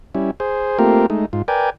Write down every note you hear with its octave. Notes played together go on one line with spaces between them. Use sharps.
G3 C#4 E4
G#4 C5
A3 A#3 C4 F4 G4 A#4
G#3 A3 D#4
G#2 F4
A#4 B4 D5 G5 G#5